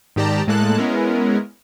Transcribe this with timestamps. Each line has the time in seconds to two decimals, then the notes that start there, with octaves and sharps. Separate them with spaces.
0.16 G#2 D#3 G4 D5 A5 A#5
0.47 A2 G#3 A#3 A4 A5 F#6
0.78 G#3 B3 C#4 E4 A#4